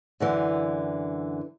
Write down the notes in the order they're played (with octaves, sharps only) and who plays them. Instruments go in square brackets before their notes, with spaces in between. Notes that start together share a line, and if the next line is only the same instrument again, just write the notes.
[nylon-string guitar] F#2 D3 E3